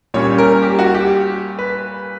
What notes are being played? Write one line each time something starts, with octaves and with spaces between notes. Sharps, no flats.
A#2 G3 C#4 C#5
A#4
G4
F#4
G4
B4